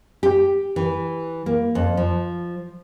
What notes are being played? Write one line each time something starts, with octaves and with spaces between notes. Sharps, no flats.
G4
E3
A#3
F2
F3